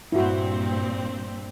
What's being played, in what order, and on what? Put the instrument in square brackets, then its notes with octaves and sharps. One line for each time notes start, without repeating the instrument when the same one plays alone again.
[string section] G2 A#2 C4 [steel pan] E4 F#4